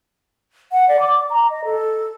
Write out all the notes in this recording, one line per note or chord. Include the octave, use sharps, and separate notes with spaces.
F#5
D5
D6
A#5
D#5
A4